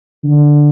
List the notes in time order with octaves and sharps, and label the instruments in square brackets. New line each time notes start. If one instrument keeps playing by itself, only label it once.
[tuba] D3